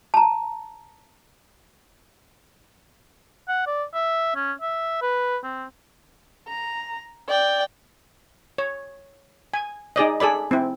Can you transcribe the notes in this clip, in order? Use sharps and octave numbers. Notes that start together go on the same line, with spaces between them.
A5 A#5
F#5
D5
E5
C#4
E5
B4
C4
A#5
D5 G5
C#5
G#5
D#4 G#4 D5 D#5
G#4 A4 D5 B5
C4 E4